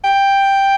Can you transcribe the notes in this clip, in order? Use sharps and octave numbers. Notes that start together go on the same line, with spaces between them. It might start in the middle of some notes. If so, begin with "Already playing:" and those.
G5